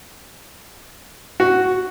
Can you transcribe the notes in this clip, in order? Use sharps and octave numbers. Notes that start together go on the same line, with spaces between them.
F#4